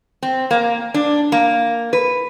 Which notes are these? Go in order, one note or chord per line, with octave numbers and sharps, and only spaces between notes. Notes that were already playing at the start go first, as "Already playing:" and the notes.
C4
A#3
D4
A#3
B4